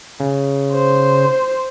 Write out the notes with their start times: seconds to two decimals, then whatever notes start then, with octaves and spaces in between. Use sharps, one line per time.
0.20 C#3
0.73 C5